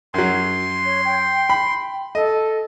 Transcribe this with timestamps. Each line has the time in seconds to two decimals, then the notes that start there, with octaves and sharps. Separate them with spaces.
0.14 F#2 F#3 C6
0.85 C#5
1.05 G5
1.50 G5 B5
2.15 A4 D#5